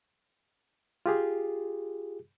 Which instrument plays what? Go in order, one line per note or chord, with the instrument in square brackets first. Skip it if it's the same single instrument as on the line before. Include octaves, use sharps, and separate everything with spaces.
[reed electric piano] F4 G4 G#4